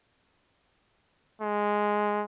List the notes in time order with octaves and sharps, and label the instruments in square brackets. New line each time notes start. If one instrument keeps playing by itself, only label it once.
[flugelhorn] G#3